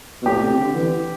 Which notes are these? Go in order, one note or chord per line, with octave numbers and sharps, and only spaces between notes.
B2
A2 G4
C3
C3
D3
E3